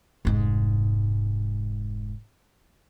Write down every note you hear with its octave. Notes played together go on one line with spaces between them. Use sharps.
F1 G#2